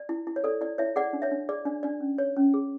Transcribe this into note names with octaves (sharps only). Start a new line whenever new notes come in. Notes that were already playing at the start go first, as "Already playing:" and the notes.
Already playing: D5
E4
E4
C#5
A4 D5
E4 D5
E4 C#5 E5
G#4 D5 F#5
D4
C#5 E5
D4
G#4 D5
D4 D5
D4 D5
C#4
C#5
C#4
G#4